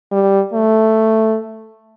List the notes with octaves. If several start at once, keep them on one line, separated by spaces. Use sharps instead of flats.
G3
A3